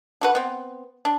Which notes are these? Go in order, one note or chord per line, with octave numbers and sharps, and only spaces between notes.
D3 F#4 B4
B3 C4
D4